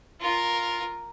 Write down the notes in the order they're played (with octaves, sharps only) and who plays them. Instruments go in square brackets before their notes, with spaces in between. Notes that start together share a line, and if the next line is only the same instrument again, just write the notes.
[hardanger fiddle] F4 A#4